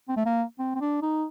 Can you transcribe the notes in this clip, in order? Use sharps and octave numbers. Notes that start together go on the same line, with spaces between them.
C4
A3
A#3
C4
C4
D4
D#4